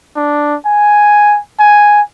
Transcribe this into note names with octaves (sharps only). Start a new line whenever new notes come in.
D4
G#5
G#5